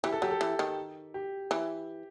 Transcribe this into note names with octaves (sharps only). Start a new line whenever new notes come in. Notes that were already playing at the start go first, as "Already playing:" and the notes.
E3 G4
A4
F#3 G4
A4
E3
D#3
G4
E3